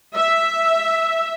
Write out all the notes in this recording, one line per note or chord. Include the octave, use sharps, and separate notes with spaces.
E5